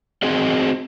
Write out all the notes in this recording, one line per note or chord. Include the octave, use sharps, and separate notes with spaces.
C4 F#4 G#4 D#5